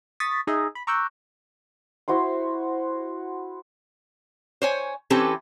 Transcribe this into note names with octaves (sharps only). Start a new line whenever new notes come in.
C#6 D#6 A6 B6
D#4 G#4 D#5 E5
B5
A#5 C#6 D6 E6 F#6 G6
E4 F#4 C5 C6
C5 C#5 G#5
E3 C4 C#4 G4 A4 B4